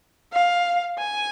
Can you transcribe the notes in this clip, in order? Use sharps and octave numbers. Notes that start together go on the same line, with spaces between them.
F5
G#5